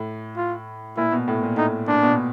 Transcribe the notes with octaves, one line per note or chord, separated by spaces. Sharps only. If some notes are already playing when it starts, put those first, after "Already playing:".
Already playing: A2
F4
A#2 E4
B2
A2
A#2
A2 D#4
A#2 D4
B2